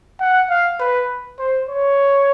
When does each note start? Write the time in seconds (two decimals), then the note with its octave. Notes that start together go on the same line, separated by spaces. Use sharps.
0.20 F#5
0.49 F5
0.80 B4
1.39 C5
1.69 C#5